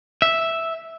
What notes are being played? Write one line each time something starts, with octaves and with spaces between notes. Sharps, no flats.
E5